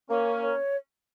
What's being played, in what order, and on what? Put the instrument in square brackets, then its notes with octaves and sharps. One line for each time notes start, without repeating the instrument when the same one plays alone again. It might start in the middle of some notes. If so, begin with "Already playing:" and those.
[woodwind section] A#3 C#4 [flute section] C#5
[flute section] A#4
C#5